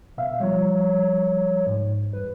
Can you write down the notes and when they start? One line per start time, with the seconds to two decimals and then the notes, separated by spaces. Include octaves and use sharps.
0.18 B2 E5 F5
0.40 F3 G3 C#5
1.67 G#2
2.13 E2 G2 B4